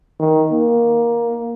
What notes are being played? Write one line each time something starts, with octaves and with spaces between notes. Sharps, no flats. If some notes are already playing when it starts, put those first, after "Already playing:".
D#3
A#3